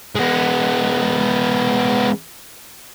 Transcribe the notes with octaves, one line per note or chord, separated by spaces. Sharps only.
G#3 B3